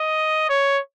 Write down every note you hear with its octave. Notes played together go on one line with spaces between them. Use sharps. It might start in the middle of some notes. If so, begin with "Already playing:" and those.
Already playing: D#5
C#5